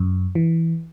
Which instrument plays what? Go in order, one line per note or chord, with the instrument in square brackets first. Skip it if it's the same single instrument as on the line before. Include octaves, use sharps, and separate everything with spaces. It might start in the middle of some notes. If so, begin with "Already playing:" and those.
Already playing: [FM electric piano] F#2
E3